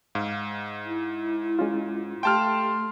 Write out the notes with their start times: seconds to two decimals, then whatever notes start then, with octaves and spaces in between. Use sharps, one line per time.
0.15 G#2 F5
0.86 E4
1.59 G#3 C#4 F4
2.23 A3 G4 F5 G5 A5 C6 F6